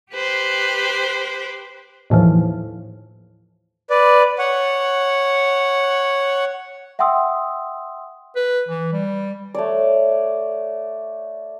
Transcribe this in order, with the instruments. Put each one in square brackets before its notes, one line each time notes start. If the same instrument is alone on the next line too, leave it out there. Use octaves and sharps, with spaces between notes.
[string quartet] G4 B4 C5 G5
[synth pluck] D#2 A2 E3 F3
[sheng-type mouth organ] B4 D5
C#5 F#5
[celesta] E5 F#5 G5 C6 D#6 E6
[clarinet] B4
E3
G3
[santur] A3 C#5 D5